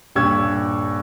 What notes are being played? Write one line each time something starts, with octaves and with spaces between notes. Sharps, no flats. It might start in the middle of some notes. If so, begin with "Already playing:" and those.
D#1 G2 G3 C#6 E6 G#6